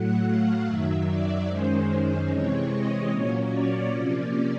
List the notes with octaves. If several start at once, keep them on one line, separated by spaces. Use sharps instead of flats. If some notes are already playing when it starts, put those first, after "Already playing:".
Already playing: A2 F#3 A3 F#5
F5
F#2 D#3 F#3 E5
D5
F#2 D#3 G#3 C#4 C5
C5
C3 E3 G#3 C4 C#5
D#5
A#2 F#3 A#3 C#4 C#5
D5
C3 F3 A#3 C#4